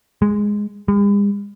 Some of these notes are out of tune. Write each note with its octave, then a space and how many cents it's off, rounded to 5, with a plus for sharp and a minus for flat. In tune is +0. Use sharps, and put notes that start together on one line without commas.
G#3 -5
G#3 -45